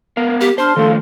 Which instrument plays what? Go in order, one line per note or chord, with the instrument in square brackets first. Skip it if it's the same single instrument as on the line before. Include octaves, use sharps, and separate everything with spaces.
[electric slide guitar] B3 A#4 F5
[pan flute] G4
[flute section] D4 A5 F6 [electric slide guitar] C5 [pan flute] C6
[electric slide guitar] D#3 F3 A3 [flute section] A4 F5